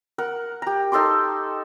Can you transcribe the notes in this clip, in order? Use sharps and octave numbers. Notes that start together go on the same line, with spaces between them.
A#4 F#5
G4 A#5
D#4 A4 C6 D6